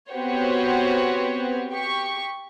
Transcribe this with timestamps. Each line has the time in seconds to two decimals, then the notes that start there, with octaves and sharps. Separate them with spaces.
0.11 B3 C4 F#4 G4 C5 C#5
1.70 G4 C#6